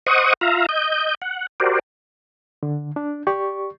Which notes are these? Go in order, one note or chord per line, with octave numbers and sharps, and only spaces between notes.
C5 D#5 F#5 C#6 D#6
F4 E5 F5 A#5
D#5 G6
F#5
F#4 G4 A#4 C5 D5
D3
D4
G4 D5 C#6